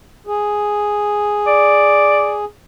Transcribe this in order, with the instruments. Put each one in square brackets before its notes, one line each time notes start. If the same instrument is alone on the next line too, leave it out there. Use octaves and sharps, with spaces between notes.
[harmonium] G#4
[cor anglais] D5